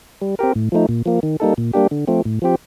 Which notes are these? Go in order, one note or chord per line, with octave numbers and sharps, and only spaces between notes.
G3
C4 G4 A#4
A2
F3 A3 D#4
A#2
F3 A#3
D#3
G3 A#3 D#4 A4
A#2
G3 A#3 D4 G4
D3
F3 A3 C4
A2
F3 C4 G4